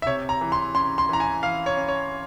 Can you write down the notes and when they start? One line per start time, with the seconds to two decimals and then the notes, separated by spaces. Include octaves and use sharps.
0.02 E5
0.06 C3 C#5
0.29 A#5
0.41 E3
0.52 C6
0.75 C#4 C6
0.98 C6
1.09 E3 A#5
1.20 G#5
1.43 E3 F5
1.66 C#5
1.77 C#4
1.88 C#5